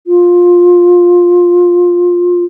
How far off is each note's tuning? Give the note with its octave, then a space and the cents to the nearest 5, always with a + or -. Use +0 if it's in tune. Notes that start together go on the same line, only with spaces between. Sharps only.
F4 +15